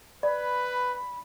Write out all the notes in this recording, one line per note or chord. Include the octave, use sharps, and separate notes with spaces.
B4 D5 B5